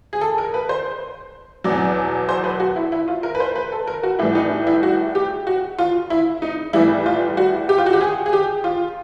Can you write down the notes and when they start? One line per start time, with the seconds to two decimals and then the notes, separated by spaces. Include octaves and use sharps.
0.13 G#4
0.21 A4
0.38 A#4
0.54 B4
0.69 C5
1.64 E2 B2 F#3 D5
2.29 C5
2.44 B4
2.60 F#4
2.76 E4
2.92 E4
3.08 F4
3.23 A#4
3.35 B4
3.40 C5
3.56 B4
3.72 A4
3.87 A#4
4.03 F#4
4.19 A2 E3 G3 E4
4.35 D#4
4.67 E4
4.83 F#4
5.15 G4
5.47 F#4
5.78 F4
6.10 E4
6.42 D#4
6.73 A2 E3 G3 E4
7.06 F4
7.37 F#4
7.69 G4
7.78 F4
7.86 F#4
7.93 G4
8.01 G#4
8.26 G#4
8.33 G4
8.64 F4